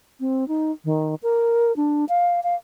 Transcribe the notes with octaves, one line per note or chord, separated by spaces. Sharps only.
C4
D#4
D#3
A#4
D4
F5
F5